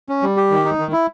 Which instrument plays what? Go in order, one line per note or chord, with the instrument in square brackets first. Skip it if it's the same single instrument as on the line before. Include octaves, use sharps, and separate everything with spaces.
[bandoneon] C#4
G3
G4
D#3
D#4
D#3
E4